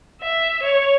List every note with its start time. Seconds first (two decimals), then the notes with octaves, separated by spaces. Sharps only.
0.21 E5
0.63 C#5